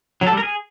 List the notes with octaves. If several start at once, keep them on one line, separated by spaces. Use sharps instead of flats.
F#3
A4
G3
A#4
G#4